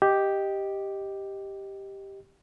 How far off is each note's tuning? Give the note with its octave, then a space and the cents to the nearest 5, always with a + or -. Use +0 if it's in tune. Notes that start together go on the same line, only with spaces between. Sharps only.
G4 +0 D#5 +0